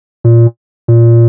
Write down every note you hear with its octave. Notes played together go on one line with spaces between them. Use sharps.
A#2
A#2